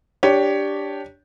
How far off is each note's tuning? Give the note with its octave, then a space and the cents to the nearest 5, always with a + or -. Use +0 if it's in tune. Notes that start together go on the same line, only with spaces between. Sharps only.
D4 -5 G4 +0 C#5 +10